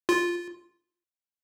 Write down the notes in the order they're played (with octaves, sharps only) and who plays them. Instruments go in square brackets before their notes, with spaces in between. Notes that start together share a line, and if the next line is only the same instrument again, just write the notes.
[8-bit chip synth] F4